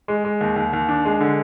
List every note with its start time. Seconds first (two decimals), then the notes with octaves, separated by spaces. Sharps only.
0.08 G#3
0.25 G#3
0.41 D#2
0.56 D#2
0.73 D#2
0.89 D4
1.05 G#3
1.20 D3